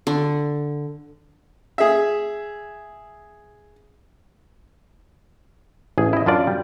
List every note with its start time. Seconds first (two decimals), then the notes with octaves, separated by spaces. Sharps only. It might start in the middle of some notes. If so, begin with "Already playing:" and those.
0.07 D3
1.78 G#4 E5
5.98 A1 G#4
6.13 E4 D#5
6.26 F#2 D4 F4 D5
6.47 G3